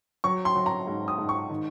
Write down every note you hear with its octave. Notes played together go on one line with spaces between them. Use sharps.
F#3 C#6
C6
F#3
A#5
G#2
D#6
G#2
C#6
D#3